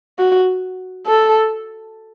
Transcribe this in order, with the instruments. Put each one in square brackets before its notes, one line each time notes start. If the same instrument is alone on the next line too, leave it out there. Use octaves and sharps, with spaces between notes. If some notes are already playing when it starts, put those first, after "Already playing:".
[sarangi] F#4
A4